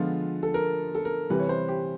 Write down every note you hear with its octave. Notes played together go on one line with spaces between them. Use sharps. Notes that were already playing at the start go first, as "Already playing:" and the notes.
Already playing: D3 F3 G#3 B3 F4
A4
A#4
A4
A#4
C3 E3 G3 B4
C#5
C5
G4